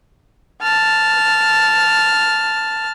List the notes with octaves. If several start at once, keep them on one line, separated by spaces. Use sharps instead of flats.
A5 F6